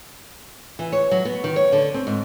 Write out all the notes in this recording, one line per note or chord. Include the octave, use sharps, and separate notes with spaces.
E3
C#5
F#3
B3
D#3
C#5
D3
C4
G#2